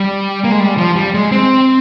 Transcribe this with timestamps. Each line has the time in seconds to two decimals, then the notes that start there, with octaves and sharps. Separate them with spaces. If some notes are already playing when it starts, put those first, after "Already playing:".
Already playing: G3
0.44 A#3
0.52 G#3
0.60 G3
0.78 F3
0.96 G3
1.14 G#3
1.32 C4